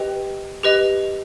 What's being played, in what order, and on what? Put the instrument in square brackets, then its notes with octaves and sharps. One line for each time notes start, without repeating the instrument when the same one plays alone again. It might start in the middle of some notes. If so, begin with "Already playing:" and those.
Already playing: [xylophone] G4 B4 D#5 G5
G4 B4 D#5